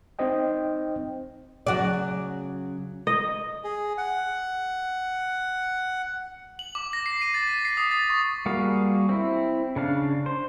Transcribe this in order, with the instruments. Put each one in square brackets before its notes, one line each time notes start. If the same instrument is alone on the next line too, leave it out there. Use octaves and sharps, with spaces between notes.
[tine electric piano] C4 D#4 C5 D#5 G5
[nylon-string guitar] C#3 F#3 [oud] F#4 D5
[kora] D#5
[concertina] G#4
F#5
[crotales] F#7
D6
A#6
C7
D#7
A6
B6
C7
D#6
A6
C#6
[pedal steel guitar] G3 A#3 F#4 G#4 F5
C4 E4
C#3 D4 F5
C5